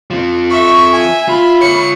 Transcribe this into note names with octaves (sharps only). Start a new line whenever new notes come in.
F3 C4
E5 C#6
G#5
F4 B5
F4 C#5 C#7